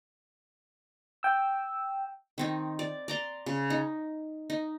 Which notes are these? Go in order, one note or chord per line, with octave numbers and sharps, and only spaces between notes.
G5 E6
D#3 C4 D#4
D5
D5 A#5 C6
C#3
D#4
D#4